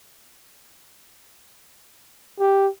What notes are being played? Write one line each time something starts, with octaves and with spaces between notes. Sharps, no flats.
G4